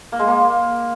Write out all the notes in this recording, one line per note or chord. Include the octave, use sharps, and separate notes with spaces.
A#3
G#3
A#3